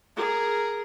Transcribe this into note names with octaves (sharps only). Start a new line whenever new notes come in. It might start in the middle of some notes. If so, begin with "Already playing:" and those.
G#4 A#4